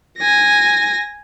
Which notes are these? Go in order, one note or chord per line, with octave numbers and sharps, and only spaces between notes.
G#5 A#6